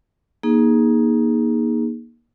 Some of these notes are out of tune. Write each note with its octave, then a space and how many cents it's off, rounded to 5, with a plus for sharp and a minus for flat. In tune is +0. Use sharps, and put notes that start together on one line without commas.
A#3 +25 D#4 +0 G#4 +0